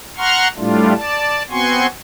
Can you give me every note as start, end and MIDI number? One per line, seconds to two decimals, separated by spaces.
0.18 0.48 78
0.18 0.48 82
0.18 0.48 84
0.18 0.48 85
0.18 0.48 89
0.57 0.93 45
0.57 0.93 55
0.57 0.93 57
0.57 0.93 62
0.57 0.93 65
0.95 1.43 74
0.95 1.43 81
1.51 1.87 59
1.51 1.87 60
1.51 1.87 66
1.51 1.87 80
1.51 1.87 84
1.51 1.87 85